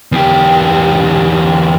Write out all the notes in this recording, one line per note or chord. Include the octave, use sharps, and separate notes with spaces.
E2 G4